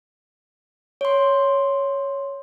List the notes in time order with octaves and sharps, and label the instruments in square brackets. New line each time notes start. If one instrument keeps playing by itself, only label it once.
[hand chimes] C#5 C6